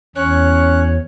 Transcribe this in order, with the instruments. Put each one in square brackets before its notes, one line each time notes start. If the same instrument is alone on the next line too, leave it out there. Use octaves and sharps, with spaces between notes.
[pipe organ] E2 [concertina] C#4 F#6 [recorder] C#5